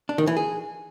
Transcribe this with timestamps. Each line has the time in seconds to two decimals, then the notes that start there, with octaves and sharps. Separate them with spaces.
0.09 D4
0.18 D#3
0.27 E3
0.37 G#4